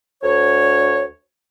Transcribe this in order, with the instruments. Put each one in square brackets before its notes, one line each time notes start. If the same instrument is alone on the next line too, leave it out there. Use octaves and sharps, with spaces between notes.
[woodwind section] D2 C#5